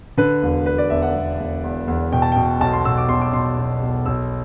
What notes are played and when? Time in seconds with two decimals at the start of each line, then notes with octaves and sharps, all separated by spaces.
0.17 D3 B4
0.43 E1
0.66 E1 B4
0.78 D5
0.90 E1 E5
1.02 F#5
1.15 E1
1.39 E1
1.63 E2
1.88 E2
2.12 B2 G5
2.22 A5
2.32 G5
2.36 B2
2.61 B1 A5
2.73 C6
2.85 B2 E6
2.98 D6
3.09 B1 C6
3.22 D6
3.33 B2 C6
3.58 B2
3.81 B1
4.06 B1 E6